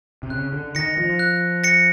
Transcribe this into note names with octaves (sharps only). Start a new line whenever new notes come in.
C3
C#3 F#6
D3
D#3 A#6 C#7
F3
F#6
A#6 C#7